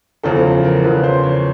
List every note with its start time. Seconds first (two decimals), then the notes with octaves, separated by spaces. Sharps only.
0.23 E2 C#3 F3 A4
0.64 A#4
0.83 E2 C#3 F3 B4
1.04 C5
1.23 C#5